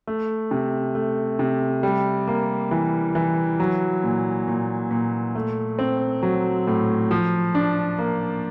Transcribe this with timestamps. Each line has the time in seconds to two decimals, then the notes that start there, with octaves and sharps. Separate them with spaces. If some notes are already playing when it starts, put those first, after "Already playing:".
0.07 A3
0.51 C3
0.95 A3
1.39 C3
1.83 G3
2.28 A#3
2.71 E3
3.15 E3
3.60 F#3
4.04 A#2
4.48 A#2
4.91 A#2
5.35 A3
5.79 C4
6.23 F#3
6.67 A2
7.11 F3
7.55 D4
7.99 A#3